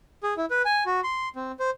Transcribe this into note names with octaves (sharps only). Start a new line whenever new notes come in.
G#4
E4
B4
G#5
F#4
C6
C4
C5